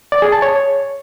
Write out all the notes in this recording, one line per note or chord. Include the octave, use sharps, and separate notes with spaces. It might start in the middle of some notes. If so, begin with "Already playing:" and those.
D5
G#4
A5
C#5